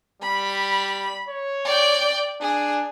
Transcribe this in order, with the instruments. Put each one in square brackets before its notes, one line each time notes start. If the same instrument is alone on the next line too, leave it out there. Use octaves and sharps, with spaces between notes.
[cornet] G3 [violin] B5
[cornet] C#5
[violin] D5 G5
[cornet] D4 [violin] G#4